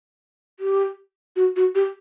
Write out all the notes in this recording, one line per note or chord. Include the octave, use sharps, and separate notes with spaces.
G4
F#4
F#4
G4